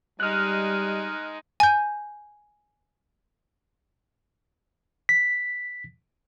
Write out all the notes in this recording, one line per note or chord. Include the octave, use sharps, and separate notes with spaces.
G3 G#3 D#4 F6 F#6
G#5 G6
B6